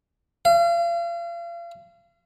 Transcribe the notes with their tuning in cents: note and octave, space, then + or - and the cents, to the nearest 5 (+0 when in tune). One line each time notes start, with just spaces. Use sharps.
F5 -35